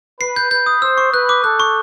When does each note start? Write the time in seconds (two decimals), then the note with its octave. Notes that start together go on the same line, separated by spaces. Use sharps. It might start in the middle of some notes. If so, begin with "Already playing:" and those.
0.20 B4 C7
0.36 G6
0.51 B4 G6
0.66 D#6
0.82 C5 E6
0.98 C#6
1.13 B4 F#6
1.29 D6
1.44 A4 F#6
1.60 C#6